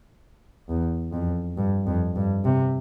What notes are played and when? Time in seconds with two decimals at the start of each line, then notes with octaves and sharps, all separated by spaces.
0.69 E2
1.13 F2
1.57 G2
1.87 F2
2.16 G2
2.45 C3